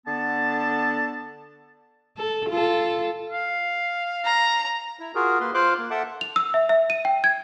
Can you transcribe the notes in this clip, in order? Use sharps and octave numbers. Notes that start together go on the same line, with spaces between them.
D3 B3 A5
A4
F4 A4
F5
A#5
E4
F4 F#4 G#4 A#4
A#3 B4 C6
F4 C5 F5 C6 D6 F#6
A#3
A4 E5 F#5 A5 D6
F7
E6
E5
E5
D#7
G5
G#6